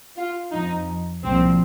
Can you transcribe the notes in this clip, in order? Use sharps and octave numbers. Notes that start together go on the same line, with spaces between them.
F4
F2 F3 D#4
C2 A#2 F3 C4